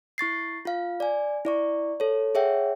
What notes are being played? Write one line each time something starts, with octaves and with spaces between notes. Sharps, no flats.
E4 C#6 A6 C7
F4 F5
D5 G#5
E4 D5 C#6
A4 C#5
G#4 C#5 E5 F#5 G5